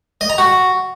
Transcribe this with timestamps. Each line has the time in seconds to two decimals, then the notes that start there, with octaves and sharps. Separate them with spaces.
0.21 D#5
0.30 A#5
0.38 F#4